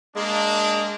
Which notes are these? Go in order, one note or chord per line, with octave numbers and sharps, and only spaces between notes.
G#3 A#3 D4